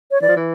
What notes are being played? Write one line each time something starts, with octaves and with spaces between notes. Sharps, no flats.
C#5
E3 D5
F3
E3